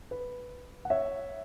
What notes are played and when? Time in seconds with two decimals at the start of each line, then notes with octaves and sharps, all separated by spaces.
0.11 B4
0.85 F#5
0.90 C#5 E5